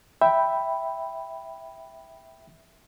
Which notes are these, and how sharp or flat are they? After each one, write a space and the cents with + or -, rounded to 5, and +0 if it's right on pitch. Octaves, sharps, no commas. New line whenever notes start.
E5 -5 G5 +0 B5 +0